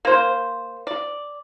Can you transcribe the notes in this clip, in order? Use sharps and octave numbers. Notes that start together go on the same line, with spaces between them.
A#3 C5
D5